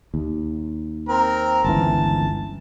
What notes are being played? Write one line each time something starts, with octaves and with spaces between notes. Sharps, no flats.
D#2
C4 A#4
G1 C#2 E3 A5